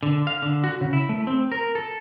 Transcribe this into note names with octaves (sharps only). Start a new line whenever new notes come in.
D3
F5
D3
F#4
C#3
E4
A3
C4
A#4
A4